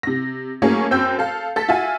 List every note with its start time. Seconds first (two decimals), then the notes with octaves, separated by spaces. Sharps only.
0.03 C3 A#6
0.62 F#3 A3 A#3 C#4 G#4 C#5
0.91 F#2 C4 G5 E6 G6
1.19 A4 F5
1.56 A4 A6 B6
1.68 F4 F#4 E5 G#5